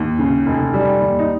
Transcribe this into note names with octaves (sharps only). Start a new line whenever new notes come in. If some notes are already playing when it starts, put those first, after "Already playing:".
Already playing: D#2
C#3
F1
G3
D#2
D#4